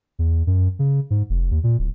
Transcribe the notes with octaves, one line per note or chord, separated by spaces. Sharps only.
E2
F#2
C#3
G#2
F1
D#2
A#2
D1